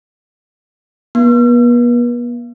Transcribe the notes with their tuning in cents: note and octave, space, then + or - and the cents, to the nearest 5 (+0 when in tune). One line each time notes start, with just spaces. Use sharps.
B3 -40